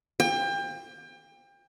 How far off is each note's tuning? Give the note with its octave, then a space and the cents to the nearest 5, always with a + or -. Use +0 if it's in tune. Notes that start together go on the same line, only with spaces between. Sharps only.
G5 +30